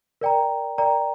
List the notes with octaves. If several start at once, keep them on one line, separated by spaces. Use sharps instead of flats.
A#4 D5 G5 A#5
A#4 D5 G5 A#5